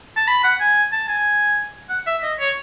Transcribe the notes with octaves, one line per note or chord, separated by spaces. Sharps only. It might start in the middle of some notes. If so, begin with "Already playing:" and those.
A5
B5
F#5
G#5
A5
G#5
F#5
E5
D#5
C#5